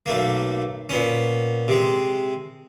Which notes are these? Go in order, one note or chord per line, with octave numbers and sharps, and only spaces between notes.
B1 A3 A#3
A#2 B3 C#4
C3 G#3